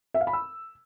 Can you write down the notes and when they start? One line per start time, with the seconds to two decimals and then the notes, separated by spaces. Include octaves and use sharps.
0.14 E5
0.21 F5
0.27 B5
0.33 E6